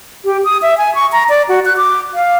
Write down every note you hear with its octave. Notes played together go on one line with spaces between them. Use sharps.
G4
D#6
E5
G#5
C#6
A#5
D5
F#4
F#6
D6
F5